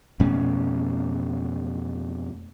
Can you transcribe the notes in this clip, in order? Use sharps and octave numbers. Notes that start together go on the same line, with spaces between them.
F2 B2 A3 C#4